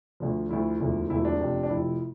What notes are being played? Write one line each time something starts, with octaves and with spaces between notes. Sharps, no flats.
D2 D3 F3
D2 D3 F3 E4
E1 D2 D3 F3
E1 D2 D3 F3 E4
D4
F1 F2 C3 F3
D4
F1 F2 C3 F3 E4